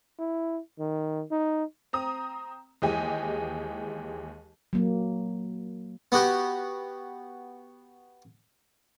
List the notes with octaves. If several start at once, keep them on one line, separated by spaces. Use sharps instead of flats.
E4
D#3
D#4
C4 A#5 D#6
D#2 E3 G#3 G4 D#5 G#5
F#3 A#3
B3 F#4 G4